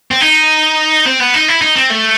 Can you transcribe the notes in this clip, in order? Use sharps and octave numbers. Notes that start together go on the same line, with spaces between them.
C4
D#4
C4
B3
D#4
E4
D#4
C4
A3